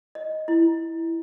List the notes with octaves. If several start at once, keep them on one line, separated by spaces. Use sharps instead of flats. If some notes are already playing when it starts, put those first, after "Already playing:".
D#5
E4